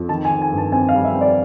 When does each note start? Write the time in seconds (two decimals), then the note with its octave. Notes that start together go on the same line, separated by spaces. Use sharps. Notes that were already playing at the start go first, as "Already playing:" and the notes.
Already playing: F2
0.09 D#3 A5
0.25 G#5
0.31 D#3
0.42 G#5
0.52 G2
0.58 A5
0.72 C4 G#5
0.89 F5
0.95 G3
1.05 E5
1.15 C4
1.21 D5